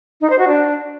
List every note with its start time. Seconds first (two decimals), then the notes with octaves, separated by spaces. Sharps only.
0.21 D#4
0.30 C5
0.39 F#4
0.48 D4